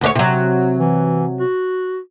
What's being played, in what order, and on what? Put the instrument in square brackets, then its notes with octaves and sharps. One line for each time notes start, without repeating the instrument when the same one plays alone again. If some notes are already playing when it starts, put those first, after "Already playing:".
[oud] D2 D4 C#5
C3 F#3
[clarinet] E3
F#4